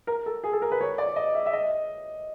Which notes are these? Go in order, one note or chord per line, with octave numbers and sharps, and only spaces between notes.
A#4
A4
G#4
A4
A#4
B4
C#5
D5
D#5
E5
E5
D#5